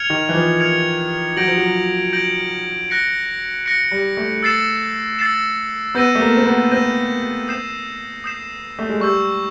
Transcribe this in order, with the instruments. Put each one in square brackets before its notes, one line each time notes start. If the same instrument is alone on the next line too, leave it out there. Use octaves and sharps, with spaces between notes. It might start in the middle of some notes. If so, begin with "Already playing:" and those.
Already playing: [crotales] F6 G#6 C#7 F7
[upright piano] D#3
E3
F3
[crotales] F6 G#6 C#7 F7
[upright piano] F#3 [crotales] G6 A#6 D7 F#7
[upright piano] F3
F#3
[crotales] G6 A#6 D7 F#7
F#6 A#6 C#7
F#6 A#6 C#7
[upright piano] G3
A3
[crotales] E6 A6 C7 E7
E6 A6 C7 E7
[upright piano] B3 [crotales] E6 G6 A#6 D#7
[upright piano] A3
A#3
C4
B3
[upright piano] C4 [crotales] E6 G6 A#6 D#7
[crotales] D#6 G6 C7 E7
D#6 G6 C7 E7
[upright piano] A3
G#3
[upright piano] G3 [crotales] C#6 E6 G6